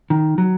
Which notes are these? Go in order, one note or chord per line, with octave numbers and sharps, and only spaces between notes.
D#3
F#3